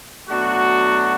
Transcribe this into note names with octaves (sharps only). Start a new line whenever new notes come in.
B2 F#3 A3 D4 F#4